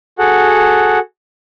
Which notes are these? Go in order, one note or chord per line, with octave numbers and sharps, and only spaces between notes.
F#4 G#4 A4 F#5